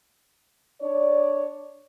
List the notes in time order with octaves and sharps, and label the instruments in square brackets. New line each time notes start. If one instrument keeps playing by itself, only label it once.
[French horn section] D4 C#5 D5